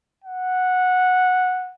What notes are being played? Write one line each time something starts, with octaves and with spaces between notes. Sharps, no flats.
F#5